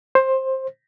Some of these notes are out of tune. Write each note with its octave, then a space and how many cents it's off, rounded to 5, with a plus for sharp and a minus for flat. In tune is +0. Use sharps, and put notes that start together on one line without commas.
C5 +15